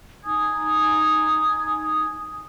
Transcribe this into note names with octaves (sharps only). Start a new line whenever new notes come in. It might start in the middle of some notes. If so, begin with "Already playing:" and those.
D#4 G#5 D#6 G#6